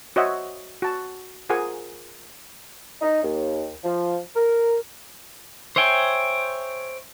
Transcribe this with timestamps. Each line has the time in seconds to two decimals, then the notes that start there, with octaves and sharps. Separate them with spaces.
0.16 F#4 C5 C#5 D#5 E5 F#5
0.82 F#4 A5
1.49 F4 G#4 A#4 C5 F#5 G#5
3.01 D#4
3.23 D#2
3.84 F3
4.35 A#4
5.76 C5 C#5 E5 G5 G#5